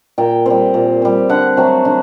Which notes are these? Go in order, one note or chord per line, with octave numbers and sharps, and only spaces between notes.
A#2 G5
G3 C4
A#2
G3 C4
D3 F#5
F#3 A3 C4
D3